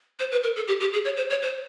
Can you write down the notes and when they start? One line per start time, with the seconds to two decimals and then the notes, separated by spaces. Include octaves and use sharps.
0.19 C5
0.31 B4
0.43 A#4
0.56 A4
0.68 G4
0.80 G4
0.93 G#4
1.05 C#5
1.17 C5
1.30 C#5
1.42 C5